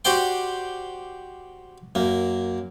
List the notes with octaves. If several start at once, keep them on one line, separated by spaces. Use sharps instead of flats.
F#4 G4 C5 D5 G5 C6
F#2 A#3